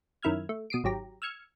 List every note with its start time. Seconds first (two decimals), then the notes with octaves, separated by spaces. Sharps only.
0.23 F#2 D#3 E4 E6 F6 G#6
0.49 A3
0.70 B2 D#6 C7 D7
0.84 G#1 F#3 G4 A#5
1.22 E6 F6 G#6 C#7